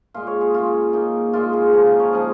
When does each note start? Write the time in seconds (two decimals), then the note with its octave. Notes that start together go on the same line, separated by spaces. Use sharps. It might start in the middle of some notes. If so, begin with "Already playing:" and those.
0.14 A#2 G#3 F4
0.27 C#5
0.41 G#4
0.54 C#3 A#3 F4
0.93 C#3 A#3 D#4
1.33 A#2 G#3 F4
1.53 G#4
1.73 C#3 F3 A#3 F4
1.87 D#4
2.00 C#5
2.13 C#3 F3 G#3 D#5